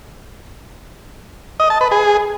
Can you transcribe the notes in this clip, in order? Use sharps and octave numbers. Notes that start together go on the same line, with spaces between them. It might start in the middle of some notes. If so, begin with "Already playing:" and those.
D#5
A5
B4
G#4